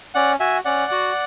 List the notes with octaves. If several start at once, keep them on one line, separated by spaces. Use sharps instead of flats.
C#4 D5 F#5
F#4 E5 G#5
C#4 D5 F#5
F#4